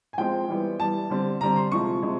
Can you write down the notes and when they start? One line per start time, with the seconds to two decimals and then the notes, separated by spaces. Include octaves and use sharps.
0.13 G#5
0.18 F3 G#3 C4 G5
0.49 E3 G3 B3
0.79 E3 G3 B3 A5
1.10 D3 G3 C4
1.41 D3 G3 C4 A#5
1.56 C6
1.72 C3 F3 G#3 C#6
2.03 C3 F3 G#3